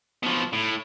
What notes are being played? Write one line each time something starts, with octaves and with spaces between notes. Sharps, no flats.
B2 F3
A2